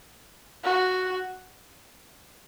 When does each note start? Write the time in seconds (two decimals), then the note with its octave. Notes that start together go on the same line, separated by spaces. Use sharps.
0.64 F#4